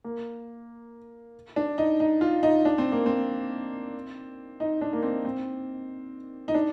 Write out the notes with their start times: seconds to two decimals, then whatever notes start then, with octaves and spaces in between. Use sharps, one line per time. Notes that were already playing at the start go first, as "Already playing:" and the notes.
0.04 A#3
1.56 D4
1.78 D#4
2.00 D#4
2.21 F4
2.43 D#4
2.65 D4
2.78 C4
2.92 A#3
3.06 C4
4.60 D#4
4.81 D4
4.93 A#3
5.03 C4
5.25 C4
6.48 D#4
6.54 D4